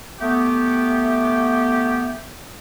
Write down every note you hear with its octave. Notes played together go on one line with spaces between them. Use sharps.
A3 B3 G4